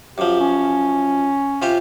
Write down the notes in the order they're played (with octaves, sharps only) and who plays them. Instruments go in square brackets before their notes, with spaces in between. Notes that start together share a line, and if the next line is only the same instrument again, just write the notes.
[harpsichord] F#2 F3 [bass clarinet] G4
[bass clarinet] C#4
[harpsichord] C3 F4 G4